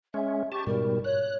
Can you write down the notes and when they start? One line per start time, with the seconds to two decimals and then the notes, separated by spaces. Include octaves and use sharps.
0.14 G#3 C#4 E5
0.52 G4 A5 C#6
0.67 G#2 B2 G3 A#4
1.04 C#5 F#6